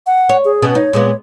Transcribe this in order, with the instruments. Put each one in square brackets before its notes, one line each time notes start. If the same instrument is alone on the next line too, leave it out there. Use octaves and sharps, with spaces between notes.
[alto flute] F#5
[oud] C#5
[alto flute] G#4
[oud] B2 B3 C#4
[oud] D#4 [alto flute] C#5
[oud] A#2 G#3 B3